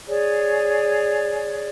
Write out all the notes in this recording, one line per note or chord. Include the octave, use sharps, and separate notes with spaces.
G#4 C#5 D5